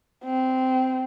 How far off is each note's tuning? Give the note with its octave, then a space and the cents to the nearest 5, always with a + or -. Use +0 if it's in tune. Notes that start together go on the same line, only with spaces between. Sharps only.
C4 -15